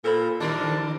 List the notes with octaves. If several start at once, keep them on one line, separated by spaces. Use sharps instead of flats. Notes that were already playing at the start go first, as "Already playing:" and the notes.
A#2 A4 C5 B5
D3 G3 D4 A#4